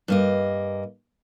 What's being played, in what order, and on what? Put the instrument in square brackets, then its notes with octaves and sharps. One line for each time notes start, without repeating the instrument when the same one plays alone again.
[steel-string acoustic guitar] G2 A#3 D#5